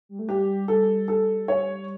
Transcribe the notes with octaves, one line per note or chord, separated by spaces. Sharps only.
G3
A3
G3 G4
G3 A4
A4
C#5